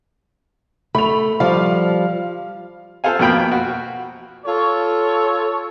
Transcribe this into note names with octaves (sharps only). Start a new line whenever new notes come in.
A3 B5 F7
F3 G3 F5
F4 A4 C5 F5 G#5
F2 B2 A#3 G5 B5
F#4
F4 A4 C#5